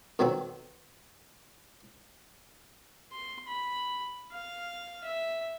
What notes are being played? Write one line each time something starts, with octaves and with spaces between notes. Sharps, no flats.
F2 B2 D#3 F#3 C4
C6
B5
F5
E5